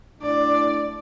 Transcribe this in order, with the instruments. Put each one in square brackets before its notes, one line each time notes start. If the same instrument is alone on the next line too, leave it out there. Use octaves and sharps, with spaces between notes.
[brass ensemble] A2 D4 [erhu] D5